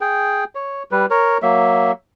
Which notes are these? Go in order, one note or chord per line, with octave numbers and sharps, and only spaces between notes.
G#4 G5
C#5
G3 B4
A#4 C#5
F#3 A#3 E5